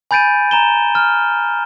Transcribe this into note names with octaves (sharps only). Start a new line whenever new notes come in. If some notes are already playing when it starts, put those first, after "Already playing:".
G#5 B5 G6 A6 D7 D#7
A#5 E7 G7
F6